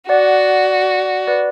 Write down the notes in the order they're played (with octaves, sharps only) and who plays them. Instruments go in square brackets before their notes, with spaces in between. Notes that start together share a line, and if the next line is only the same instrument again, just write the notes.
[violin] F#4 [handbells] D5 F#5
[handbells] B4 D5